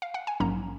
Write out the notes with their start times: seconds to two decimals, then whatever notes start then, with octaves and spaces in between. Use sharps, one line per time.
0.02 F5
0.14 F#5
0.27 G#5
0.40 A#1 G#2 F#3 A#3 C#4 A#5